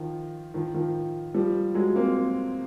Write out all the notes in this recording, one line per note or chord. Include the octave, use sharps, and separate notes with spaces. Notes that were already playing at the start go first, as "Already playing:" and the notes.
Already playing: D#3 F3
D#3 F3
D#3 F3
F3 G3
F#3 G#3
A#3 C4